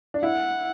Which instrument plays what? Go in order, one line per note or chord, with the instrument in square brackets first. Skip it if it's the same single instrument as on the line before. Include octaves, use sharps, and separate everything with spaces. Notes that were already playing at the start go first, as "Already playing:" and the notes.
[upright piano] D4
[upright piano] E4 [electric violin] F#5